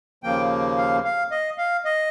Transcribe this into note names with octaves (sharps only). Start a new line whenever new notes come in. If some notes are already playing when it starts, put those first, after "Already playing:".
D#2 C#3 F3 A#3 G5
F5
F5
D#5
F5
D#5